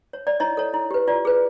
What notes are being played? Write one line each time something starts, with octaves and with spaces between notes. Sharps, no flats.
C#5
D5
E4 C#5 D#5
A4 C#5
E4
G4 B4
F4 D5
G#4 B4